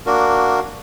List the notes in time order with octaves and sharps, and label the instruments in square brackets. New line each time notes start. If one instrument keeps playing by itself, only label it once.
[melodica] A#3 D4 F#4 A#4